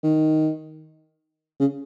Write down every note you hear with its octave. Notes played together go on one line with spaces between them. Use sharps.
D#3
C#3